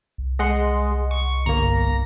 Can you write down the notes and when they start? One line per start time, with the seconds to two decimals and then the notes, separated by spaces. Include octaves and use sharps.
0.18 C2
0.39 G#3 D#5 F#5 C6
1.11 C#6
1.46 G1 A#3 A#5